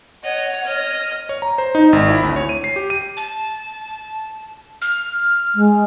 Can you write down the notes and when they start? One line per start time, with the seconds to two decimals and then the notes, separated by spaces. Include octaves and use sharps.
0.24 C#5 D#5 F#5
0.65 D#5 F6
1.29 C#5
1.42 A#5
1.58 C5
1.75 D#4
1.93 G#1
2.10 E4
2.23 D2
2.36 C#5
2.49 D#7
2.64 C7
2.76 G4
2.90 D#7
3.17 A5
4.82 F6
5.55 G#3